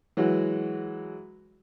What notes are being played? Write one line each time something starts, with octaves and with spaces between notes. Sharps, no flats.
E3 F#3 G#3 F#4